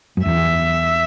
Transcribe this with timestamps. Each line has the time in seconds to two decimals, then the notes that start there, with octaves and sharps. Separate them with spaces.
0.17 F#2
0.25 E2 E5